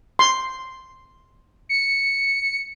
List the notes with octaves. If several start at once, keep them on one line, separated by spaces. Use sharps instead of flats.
C6
C#7